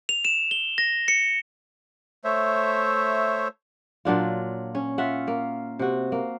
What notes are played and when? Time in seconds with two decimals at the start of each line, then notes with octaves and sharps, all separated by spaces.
0.09 F7
0.25 E7
0.51 G7
0.78 A#6
1.08 C#7
2.24 A3 C5 C#5 E5
4.05 A#2 F#3 D4 F4
4.75 C#4
4.98 F4 E5 F#5
5.27 A#3
5.79 C3 F#4
6.12 A#3